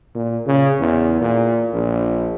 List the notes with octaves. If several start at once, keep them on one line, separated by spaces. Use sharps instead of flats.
A#2
C#3
E2
A#2
A#1